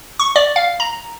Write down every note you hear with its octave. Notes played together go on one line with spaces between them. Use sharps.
C#6
D5
F5
A#5